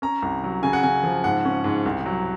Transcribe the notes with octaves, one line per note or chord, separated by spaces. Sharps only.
C#4 A#5
C2
F#3
C#3 G#5
F#5
C#3 G#5
F3
G#2 F#5
C#4
G#2
C2
F#3